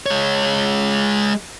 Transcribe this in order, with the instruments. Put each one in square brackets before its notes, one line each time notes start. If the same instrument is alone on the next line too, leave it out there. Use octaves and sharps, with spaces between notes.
[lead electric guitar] G#3 C#5